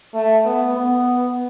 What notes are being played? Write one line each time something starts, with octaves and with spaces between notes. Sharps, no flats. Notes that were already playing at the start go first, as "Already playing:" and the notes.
A3
B3
B3